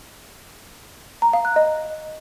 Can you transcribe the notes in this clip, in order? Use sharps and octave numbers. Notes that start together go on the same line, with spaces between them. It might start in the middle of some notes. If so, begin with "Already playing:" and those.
A#5
F5
F#6
D#5